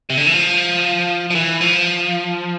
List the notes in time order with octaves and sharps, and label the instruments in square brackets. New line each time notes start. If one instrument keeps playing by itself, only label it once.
[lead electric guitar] C3
D3
E3
F3
F3
E3
F3